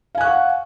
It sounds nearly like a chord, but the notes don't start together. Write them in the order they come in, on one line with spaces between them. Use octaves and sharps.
F5 G#5 F#6 C#6 F#5